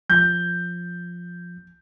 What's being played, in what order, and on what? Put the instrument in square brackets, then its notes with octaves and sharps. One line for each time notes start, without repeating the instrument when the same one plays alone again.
[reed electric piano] F3 [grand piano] G6